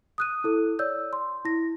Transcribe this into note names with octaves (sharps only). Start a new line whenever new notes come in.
D#6 F#6 D#7
E4 A4
C#5 D5 E6 G6
C6
E4 A#6